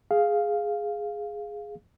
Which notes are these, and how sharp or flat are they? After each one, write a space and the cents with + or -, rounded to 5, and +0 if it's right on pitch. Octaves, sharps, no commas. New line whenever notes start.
G#4 +0 F5 +0